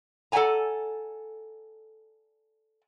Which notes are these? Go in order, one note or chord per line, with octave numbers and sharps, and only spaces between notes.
A4 D5 E5 F#5 G#5 A#5